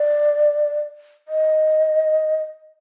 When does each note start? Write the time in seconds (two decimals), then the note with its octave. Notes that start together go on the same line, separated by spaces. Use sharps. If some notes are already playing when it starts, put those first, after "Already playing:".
Already playing: D5
1.28 D#5